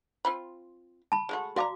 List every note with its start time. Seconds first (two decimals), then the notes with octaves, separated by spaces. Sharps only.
0.25 C4 F4 B5
1.12 A5 B5
1.29 G#3 A3 F#4
1.56 F#4 D5 F5 A5 A#5 D6